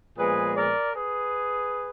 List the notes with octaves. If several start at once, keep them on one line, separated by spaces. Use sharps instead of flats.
A#2 F3 G#3 B3 G#4 B4
A#4 D5
G#4 B4